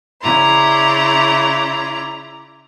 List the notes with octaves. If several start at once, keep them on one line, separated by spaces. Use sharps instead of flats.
C#3 E4 D5 A#5 C6